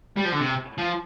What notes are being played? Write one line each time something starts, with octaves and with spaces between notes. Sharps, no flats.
G3
F3
D3
C3
F3